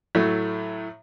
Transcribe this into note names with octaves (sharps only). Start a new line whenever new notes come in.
A2 F#3 A3